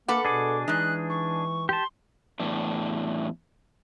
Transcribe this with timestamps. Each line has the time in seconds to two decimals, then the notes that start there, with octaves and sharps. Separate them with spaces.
0.08 A#3 A4 B4 F#5 D6
0.25 B2 D4 G#4 D6
0.68 E3 G#3 D#4 F#6
1.10 C#6
1.69 G4 A5 C6
2.39 E2 A2 D4